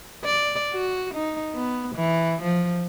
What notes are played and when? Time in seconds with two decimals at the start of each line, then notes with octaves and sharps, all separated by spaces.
0.25 D5
0.73 F#4
1.15 D#4
1.55 B3
1.96 E3
2.43 F3